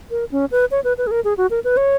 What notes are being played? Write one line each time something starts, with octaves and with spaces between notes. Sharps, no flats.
A#4
C#4
B4
C#5
B4
B4
G#4
A#4
G#4
F#4
A#4
B4
C#5